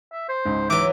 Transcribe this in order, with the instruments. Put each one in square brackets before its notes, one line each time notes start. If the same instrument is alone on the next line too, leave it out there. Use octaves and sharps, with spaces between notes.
[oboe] E5
C5
[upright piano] C#2 G#2
[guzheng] E3 F#3 [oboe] E5 [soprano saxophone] D6